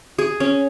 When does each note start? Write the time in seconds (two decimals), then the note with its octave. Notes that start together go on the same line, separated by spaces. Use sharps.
0.19 G#4
0.40 C#4